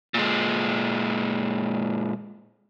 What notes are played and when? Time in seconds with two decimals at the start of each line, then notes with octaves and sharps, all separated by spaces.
0.14 A#2 G#3